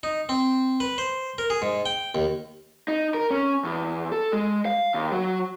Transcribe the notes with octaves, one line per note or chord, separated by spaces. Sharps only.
D#4
C4
B4
C5
A#4
G#4
G#2
G5
D#2
D#4
A#4
C#4
E2
A4
G#3
F5
D#2
F#3